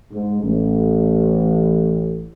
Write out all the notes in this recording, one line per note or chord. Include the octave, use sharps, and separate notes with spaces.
G#2
A1